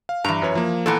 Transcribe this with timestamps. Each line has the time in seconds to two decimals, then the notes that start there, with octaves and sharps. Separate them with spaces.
0.09 F5
0.24 G2 E3 A#5
0.42 F#2 B4 C#5
0.55 F3 A#3
0.86 A#2 E3 B3 A4 A#5